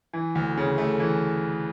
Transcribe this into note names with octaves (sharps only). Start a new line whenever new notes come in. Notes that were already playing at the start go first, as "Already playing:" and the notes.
E3
D2
C#3
A3
E3